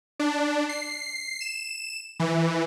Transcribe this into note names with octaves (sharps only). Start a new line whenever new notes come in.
D4
C7
E7
E3